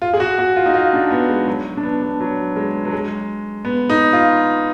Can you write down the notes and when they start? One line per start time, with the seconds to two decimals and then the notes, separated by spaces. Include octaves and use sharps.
0.02 F4
0.13 G#4
0.20 F#4
0.38 F#4
0.56 F4
0.66 D#4
0.74 F4
0.93 D4
1.11 B3
1.29 G#3
1.47 F#3
1.77 D4
1.83 B3
2.02 D4
2.20 F#3
2.56 G#3
2.85 F#3
2.93 G#3
3.65 B3
3.90 D#4
4.13 F4